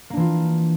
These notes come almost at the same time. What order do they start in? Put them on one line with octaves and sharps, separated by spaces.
A#3 D4 E3 F4